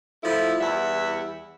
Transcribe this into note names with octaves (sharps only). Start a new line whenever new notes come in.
F3 A3 E4
E2 G3 E4 E5 F#5